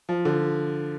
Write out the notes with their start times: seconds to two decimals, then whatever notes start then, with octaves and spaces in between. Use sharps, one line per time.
0.09 F3
0.25 D3